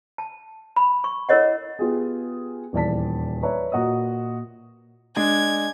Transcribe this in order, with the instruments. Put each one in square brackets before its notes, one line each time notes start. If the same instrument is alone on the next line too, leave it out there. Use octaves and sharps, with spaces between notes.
[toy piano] A5
B5
C#6
E4 A4 A#4 C#5 D#5 F#5
[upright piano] B3 F4 G4 G#4
D#1 E2 D5 A5 B6
B4 C#5 D5 E5 A#5
A#2 F#4 D#5 D#6
[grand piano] G#3 D4 [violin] G#6